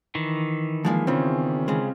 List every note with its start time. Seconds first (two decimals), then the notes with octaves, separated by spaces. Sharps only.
0.15 D#3 E3
0.85 F3 G#3 A#3
1.07 E2 C#3 C4 C#4 F4
1.68 C#3 G#3